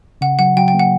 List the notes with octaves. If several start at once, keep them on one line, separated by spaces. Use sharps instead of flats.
C#3 F#5
F#3 F#5
F#3 G5
G5
A#3
F#5